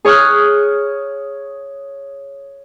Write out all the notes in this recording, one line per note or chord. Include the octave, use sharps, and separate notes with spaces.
G#4 C#5 D#6 F6 F#6